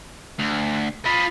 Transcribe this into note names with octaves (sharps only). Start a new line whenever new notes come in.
D2
F4 D#5 B5